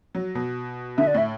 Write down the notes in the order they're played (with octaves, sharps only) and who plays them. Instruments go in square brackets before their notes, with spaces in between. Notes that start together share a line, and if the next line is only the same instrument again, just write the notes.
[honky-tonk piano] F#3
B2
[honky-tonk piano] D3 [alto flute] E5
[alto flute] D5
[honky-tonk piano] A2 [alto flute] E5